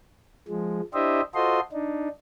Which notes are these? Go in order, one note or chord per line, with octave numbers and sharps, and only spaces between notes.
F3 G#3
D4 E4 G4 C5 D#5 E5
F4 F#4 A4 C5 D#5 C6
D4 D#4